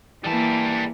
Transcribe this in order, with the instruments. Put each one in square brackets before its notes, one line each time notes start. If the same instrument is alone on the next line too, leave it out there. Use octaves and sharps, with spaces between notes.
[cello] E3 A#3 [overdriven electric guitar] G3 A5